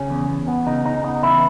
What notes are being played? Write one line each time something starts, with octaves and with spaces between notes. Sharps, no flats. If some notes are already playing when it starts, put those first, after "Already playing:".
Already playing: C#3 C#4
E2
E2
B3
C#3 D#4
C#3 D#4
B3 D#4
C#3 E3 E4